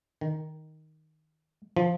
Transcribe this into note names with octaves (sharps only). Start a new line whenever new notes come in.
D#3
F3